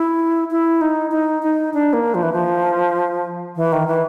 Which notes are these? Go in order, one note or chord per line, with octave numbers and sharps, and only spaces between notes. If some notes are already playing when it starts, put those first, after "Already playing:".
Already playing: E4
E4
D#4
D#4
D#4
D4
A#3
F3
E3
F3
E3
D#3
E3